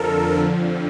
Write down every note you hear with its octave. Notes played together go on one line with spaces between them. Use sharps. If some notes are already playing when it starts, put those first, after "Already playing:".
Already playing: F2 D3 F3 A4 A#4
F2 D3 F3